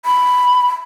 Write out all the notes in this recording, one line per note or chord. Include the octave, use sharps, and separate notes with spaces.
B5